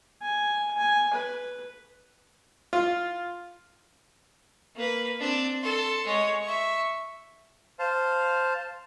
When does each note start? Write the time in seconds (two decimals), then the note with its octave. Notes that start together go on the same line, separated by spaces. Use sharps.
0.22 G#5
0.78 G#5
1.14 B4
2.73 F4
4.75 A#3 B4
5.20 C4 D4
5.62 A4 C6
6.06 G#3 C#5
6.42 E5 C#6
7.79 C5 F5 A5